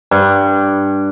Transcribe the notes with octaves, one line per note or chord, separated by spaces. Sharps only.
G2